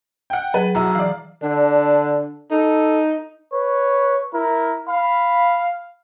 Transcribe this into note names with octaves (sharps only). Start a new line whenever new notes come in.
F#5 G5
F#3 G#4 B4
B1 E4 F#4 A#5
E3 D5 F5
D3 D4
D#4 A4
B4 C#5
E4 A#4
F5 B5